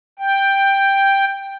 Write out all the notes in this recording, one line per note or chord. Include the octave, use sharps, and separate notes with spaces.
G5